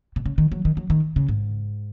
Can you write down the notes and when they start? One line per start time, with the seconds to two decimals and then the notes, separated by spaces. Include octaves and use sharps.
0.16 B2
0.26 C#3
0.38 D#3
0.52 F#3
0.65 D#3
0.77 F#3
0.90 D#3
1.16 C#3
1.28 G#2